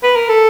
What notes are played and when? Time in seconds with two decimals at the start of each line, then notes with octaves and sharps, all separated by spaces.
0.03 B4
0.16 A#4
0.29 A4